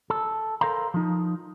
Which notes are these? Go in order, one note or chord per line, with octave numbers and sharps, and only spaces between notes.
A4
A4 A#4 C5 F5 A#5
F3 D#4